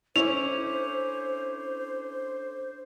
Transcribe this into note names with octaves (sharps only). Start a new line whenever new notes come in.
C#4 D4 E4 A4 C5 D6 F7